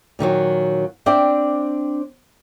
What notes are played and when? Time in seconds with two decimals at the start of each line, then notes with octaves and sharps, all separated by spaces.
0.19 A#2 D#3 E3 F#3
1.06 C4 D4 C5 D5 E5 G5